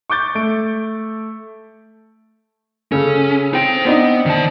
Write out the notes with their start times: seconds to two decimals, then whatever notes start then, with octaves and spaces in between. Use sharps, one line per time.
0.10 C#6 D6 G6 A6
0.35 A3 D7
2.92 C#3 C#4 A4
3.53 C4 D#4 G5
3.85 B3 C4 D4 D#4
4.26 D#3 A5